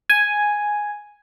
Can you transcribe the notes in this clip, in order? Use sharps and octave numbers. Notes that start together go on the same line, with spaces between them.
G#5